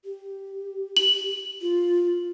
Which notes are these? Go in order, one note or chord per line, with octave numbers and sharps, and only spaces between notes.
G4
F#7
F4